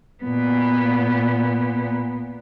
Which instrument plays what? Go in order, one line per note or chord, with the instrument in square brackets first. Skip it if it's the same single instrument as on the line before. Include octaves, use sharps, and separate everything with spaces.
[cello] A#2 B3